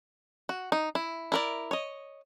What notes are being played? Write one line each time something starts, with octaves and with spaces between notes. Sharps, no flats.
F#4
D#4
E4
E4 A#4 D5
C#5 D#5